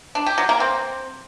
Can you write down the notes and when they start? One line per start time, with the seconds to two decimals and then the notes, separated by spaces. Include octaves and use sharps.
0.15 D4
0.26 G4
0.38 F#3
0.49 A#3
0.60 C4